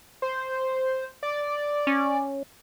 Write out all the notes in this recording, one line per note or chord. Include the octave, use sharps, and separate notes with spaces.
C5
D5
C#4